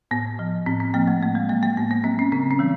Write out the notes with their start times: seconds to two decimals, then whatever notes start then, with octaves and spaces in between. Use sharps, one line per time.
0.11 A2 B3
0.39 F3
0.66 A2 C4
0.80 C4
0.94 F3 A#3
1.08 A3
1.22 A2 A3
1.35 G#3
1.49 F#3 A#3
1.63 A#3
1.77 A2 B3
1.91 B3
2.04 F#3 C4
2.19 C#4
2.32 C#3 C4
2.51 C#4
2.59 E3 G3